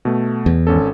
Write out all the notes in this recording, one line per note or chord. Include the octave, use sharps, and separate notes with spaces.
B2 A3
E2
G#1 C#4 A4